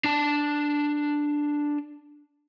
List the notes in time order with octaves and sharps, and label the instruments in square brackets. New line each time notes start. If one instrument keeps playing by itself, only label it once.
[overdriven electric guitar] D4 A5